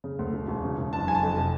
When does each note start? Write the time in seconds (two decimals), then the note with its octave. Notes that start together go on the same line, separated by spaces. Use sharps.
0.04 C#3
0.19 D2
0.34 E1
0.48 E1
0.63 C#3
0.78 E1
0.93 F#1 A5
1.08 F#1 G#5
1.15 A5
1.23 F2
1.37 C3